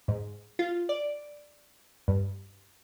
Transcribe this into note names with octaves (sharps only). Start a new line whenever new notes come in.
G#2
F4
D5
G2